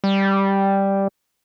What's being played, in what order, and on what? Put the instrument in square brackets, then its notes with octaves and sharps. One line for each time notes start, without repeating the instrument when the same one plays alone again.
[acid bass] G3